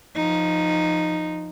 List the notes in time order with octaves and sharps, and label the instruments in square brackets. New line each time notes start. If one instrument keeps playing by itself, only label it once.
[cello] F3 D#4